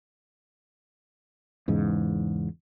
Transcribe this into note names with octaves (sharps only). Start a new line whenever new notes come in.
E2 G#2 C#3